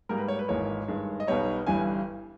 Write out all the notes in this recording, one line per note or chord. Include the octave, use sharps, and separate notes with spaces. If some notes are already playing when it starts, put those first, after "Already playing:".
G#2 G3 A#3 A#4
B4
C#5
B4
G#1 G#2 E3 A#3 C#5
G2 D#3 G#3
D#5
B1 B2 G3 B3 D#4 C#5
G1 G2 E3 G3 G#5